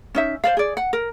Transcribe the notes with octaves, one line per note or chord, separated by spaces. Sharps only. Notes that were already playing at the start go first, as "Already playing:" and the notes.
C#4 D#4 E5
C5 D5 F5
G#4 D5
F#5
A#4